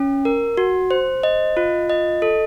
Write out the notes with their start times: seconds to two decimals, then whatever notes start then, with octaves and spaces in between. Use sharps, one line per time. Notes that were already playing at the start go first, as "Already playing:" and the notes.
Already playing: C#4
0.25 A#4
0.57 F#4
0.91 C5
1.23 D#5
1.57 F4
1.90 D#5
2.22 A4